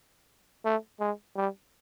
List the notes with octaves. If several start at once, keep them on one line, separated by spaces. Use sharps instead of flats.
A3
G#3
G3